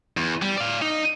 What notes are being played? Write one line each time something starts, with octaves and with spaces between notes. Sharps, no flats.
E2
G3
D5 F5
D#4